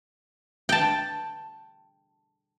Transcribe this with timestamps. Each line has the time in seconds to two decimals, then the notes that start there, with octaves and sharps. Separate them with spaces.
0.69 G5 A5